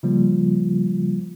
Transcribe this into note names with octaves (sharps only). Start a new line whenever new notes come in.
C#3 F3 G3 A#3 F4